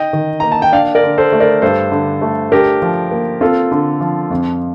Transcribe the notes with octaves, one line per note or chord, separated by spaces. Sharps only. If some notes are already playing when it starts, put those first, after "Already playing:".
Already playing: D#4 D#5 G5
D#3
A#3 A#5
A5
G5
D4 D5 F5
A#4 D5
D3
A4 C5
A3
A#4 D5
G2 A4 C5
D3
A3
D4 G4 A#4
F3
A#3
C4 F4 A4
D3
F3
F2